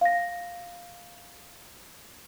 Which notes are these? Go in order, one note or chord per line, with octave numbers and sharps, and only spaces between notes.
F5 A#6